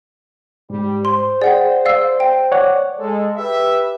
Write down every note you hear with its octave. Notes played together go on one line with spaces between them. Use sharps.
G#2 G3
C5 C6
G#4 D5 F#5 G5
D5 F5 E6
G5
C#5 D5 F#5
G#3 A4
G4 B4 E5